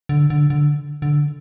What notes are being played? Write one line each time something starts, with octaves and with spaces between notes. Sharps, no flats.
D3
D3
D3
D3